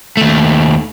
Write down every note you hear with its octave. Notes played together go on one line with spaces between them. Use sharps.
D#2 A3